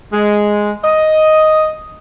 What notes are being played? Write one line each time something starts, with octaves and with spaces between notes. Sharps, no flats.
G#3
D#5